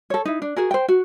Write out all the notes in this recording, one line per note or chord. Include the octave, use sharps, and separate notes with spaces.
A4 C#5
D#4 E4
D4
F#4 G#4 A#4
C5 G5
F#4